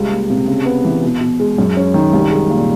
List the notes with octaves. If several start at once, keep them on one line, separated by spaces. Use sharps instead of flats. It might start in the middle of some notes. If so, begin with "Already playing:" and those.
Already playing: C#2 G3
A#3
C3
C#3
B3
E3
B2
B2
G#3
F#2
C#4
D#3
C2
G#3
A#2